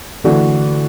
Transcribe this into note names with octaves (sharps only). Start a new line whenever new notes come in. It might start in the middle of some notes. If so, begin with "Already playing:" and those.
D3 E3 A3 D4 F#4